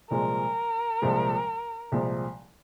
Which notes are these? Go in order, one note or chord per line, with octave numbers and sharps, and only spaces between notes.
C2 A#2 F3 G#3 A#4
C2 A#2 F3 G#3
C2 A#2 F3 G#3